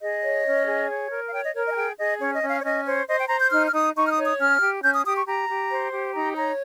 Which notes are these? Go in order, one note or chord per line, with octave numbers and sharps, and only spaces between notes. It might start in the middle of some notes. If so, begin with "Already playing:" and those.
G#4 D#5
C#5
C#4
G#4
C#5
A#4
F5
C#5 G5
D#5
A#4 C#5
D#5
G#5
G#4 G5
G#4 D#5
C#4 C#5
D#5
C#4
F5
C#5
C#4 D#5
C5 C#5
C5 D#5
G5
C5 A#5
G6
D#4 F6
F6
D#4 D#6
D#4 C#6
F6
D#6
C#5
D#6
C#4 F6
G4
C#4 G6
D#6
G4 D#6
C#6
G4 A#5
G4
C5
G4
D#4 A#5
C#5 A#5